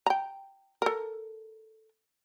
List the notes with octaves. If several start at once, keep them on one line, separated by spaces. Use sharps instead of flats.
G5 A#5
A4 A#4